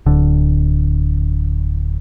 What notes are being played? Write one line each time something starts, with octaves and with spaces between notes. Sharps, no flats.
D1 D3